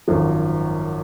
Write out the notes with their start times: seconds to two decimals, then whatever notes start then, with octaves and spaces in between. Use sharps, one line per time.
0.08 G#1 F#2 F3